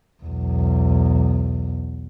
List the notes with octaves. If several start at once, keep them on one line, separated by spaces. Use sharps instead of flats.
B1 E2